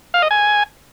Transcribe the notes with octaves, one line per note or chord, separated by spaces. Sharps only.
F5
D#5
G#5